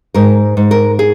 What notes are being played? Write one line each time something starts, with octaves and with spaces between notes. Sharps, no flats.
G#2 A#4
G#2
A#4
G#4